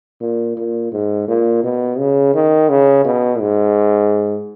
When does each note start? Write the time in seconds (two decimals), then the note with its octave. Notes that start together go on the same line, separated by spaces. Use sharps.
0.21 A#2
0.57 A#2
0.92 G#2
1.28 A#2
1.63 B2
1.99 C#3
2.34 D#3
2.69 C#3
3.05 B2
3.40 G#2